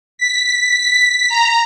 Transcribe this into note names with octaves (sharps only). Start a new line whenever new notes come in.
B6
A#5